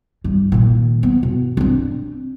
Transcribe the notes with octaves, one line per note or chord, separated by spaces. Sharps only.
G2
A#2 D#3
B3
B2
C4 D4